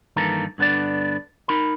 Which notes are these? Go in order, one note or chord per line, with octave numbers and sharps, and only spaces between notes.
G2 D#3 E3 A#3 A4 A#5
G2 D3 B3 D4 D5
D#4 A#4 B5